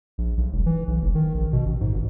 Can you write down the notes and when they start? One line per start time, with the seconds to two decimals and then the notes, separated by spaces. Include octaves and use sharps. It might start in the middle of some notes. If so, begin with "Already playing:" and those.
0.18 A#1
0.37 B1
0.53 E1
0.66 E3
0.87 B1
1.02 F#1
1.15 D#3
1.34 A#1
1.53 B2
1.65 A1
1.81 G#2
1.94 G#1